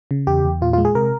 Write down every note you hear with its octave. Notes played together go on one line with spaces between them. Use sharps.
C#3
E2 G4
E2
A#2 F4
F4
G#3
G#4
C3 A#4